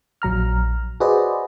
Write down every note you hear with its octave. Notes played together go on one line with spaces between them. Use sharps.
A#1 F#3 A#5 F6
F#4 G#4 B4 C5 D5 D#5